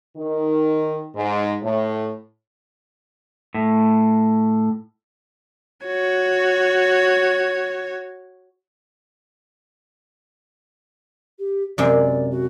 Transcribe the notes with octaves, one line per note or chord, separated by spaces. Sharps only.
D#3
G#2
A2
A2
F#4 C#5
G4
F#2 C3 G#3 D5
F#4